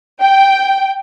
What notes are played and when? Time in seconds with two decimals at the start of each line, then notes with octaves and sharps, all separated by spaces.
0.21 G5